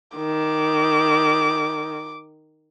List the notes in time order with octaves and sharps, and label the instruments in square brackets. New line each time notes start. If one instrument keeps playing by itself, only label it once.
[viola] D#3 [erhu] D6